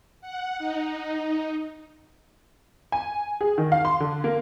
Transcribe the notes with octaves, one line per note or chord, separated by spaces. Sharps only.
F#5
D#4
G#5
G#4
D#3
F5
C6
D3
A#3